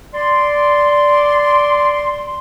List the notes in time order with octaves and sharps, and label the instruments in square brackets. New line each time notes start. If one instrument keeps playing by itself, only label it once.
[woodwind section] D5 C6